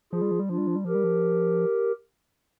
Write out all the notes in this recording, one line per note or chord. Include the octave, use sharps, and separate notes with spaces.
F3 F4 G#4
G3
F3
G3
F3 D4 F4
G3
F3
G3
F3 G4 A#4
G3
F3